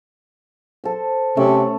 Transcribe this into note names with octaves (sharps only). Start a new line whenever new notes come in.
A4 C5
C3 A3 C#4